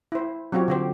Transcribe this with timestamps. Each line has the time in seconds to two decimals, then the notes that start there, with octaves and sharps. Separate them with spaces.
0.12 E4 C5
0.52 F#3 C4 F4 G4 C#5
0.68 D3 G4 C5